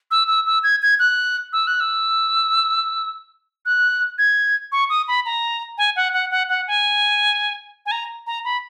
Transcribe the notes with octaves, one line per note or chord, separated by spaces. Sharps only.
E6
E6
E6
G#6
G#6
F#6
E6
F#6
E6
F#6
G#6
C#6
D#6
B5
A#5
G#5
F#5
F#5
F#5
F#5
G#5
G#5
A#5
A#5
B5